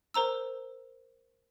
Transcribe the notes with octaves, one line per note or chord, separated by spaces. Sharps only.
A#4 C5 A#5 E6